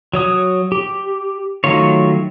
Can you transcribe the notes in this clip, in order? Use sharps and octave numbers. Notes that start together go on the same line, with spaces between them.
F#3 C#5 D#6
G4
D#3 F#3 A3 F4 C#5